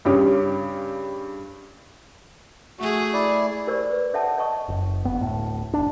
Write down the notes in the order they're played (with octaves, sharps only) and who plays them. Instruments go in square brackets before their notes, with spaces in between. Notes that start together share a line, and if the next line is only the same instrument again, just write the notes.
[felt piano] G2 C#3 C#4 G4 C#5 D#6
[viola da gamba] A3 G#4 [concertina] F#4
[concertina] E4 D5
[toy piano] G4 A#4 C5 D5 C#6
B4
A4 C#5 E5 F#5 G5 A5
C#5 D#5 A5 C#6 D#6
[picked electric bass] F#1
G1 B3
D1 A2
F1 D4